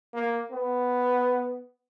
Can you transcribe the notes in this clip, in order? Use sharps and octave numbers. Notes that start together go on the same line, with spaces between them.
A#3
B3